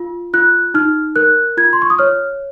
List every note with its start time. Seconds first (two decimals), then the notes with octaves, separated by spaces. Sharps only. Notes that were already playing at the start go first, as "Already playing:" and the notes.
Already playing: F4
0.33 F4 F#6
0.74 D#4 F6
1.16 A#4 F#6
1.57 F4 G#6
1.73 C6
1.82 C#6
1.90 D#6
1.99 C#5 F6